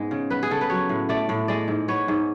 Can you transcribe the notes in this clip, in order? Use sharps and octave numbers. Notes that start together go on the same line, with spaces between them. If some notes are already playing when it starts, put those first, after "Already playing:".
Already playing: G#2 G#3 B3
C#3
B3 B4
G#4
C#3 A4
B4
F#3 C#5
A2
A3 D5
A2
G#3 D5
G#2
B3 C#5
G#2